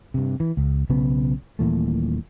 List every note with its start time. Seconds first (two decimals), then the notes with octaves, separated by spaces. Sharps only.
0.14 G2 C3
0.40 E3
0.57 C#2
0.89 B1 C#3 B3
1.59 D#1 A#2 E3 A3